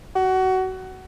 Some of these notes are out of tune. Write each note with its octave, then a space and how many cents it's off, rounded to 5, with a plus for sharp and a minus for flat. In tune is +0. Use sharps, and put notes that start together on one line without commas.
F#4 +20